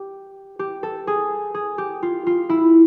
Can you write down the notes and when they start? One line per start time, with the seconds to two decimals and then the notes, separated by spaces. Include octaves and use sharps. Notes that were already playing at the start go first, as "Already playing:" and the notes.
Already playing: G4
0.59 G4
0.83 A4
1.07 G#4
1.54 G#4
1.78 G4
2.03 F4
2.27 F4
2.49 E4